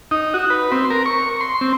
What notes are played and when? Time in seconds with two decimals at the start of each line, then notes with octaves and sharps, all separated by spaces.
0.11 D#4
0.34 F#4
0.50 B4
0.72 C4
0.90 A#4
1.06 C#6
1.41 C6
1.61 C4